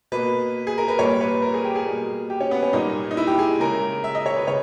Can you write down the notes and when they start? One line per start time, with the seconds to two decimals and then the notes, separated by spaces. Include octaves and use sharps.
0.12 B2 A#3 B4
0.67 G#4
0.78 A#4
0.88 B4
0.99 A#2 G3 A#3 C#5
1.21 B4
1.42 A#4
1.54 G#4
1.64 G4
1.76 G#4
1.86 B2 G3 A#3
2.30 G4
2.40 C#4
2.51 B3
2.63 C#4
2.73 A#2 G3 A#3 D#4
3.11 D#4
3.17 E4
3.27 G4
3.39 G#4
3.60 C#3 G#3 A#4
4.04 E5
4.15 D#5
4.26 C#5
4.37 B4
4.47 C#3 C#5